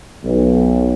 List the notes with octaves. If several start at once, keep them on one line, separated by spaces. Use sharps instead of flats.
B1